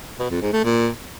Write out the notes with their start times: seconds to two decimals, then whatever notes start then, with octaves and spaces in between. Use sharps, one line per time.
0.20 B2
0.31 F2
0.42 G#2
0.53 A3
0.64 A#2